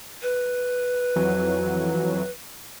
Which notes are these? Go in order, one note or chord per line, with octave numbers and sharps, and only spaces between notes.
B4
F2 E3 F#3